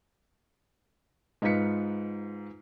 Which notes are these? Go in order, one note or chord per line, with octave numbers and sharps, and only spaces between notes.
G#2 D#4 F4 B4 B6 C#7